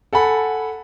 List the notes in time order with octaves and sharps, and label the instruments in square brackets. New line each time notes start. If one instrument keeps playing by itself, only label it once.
[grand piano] A4 F#5 G#5 B5